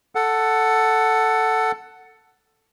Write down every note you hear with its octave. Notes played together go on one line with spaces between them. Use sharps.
A4 F#5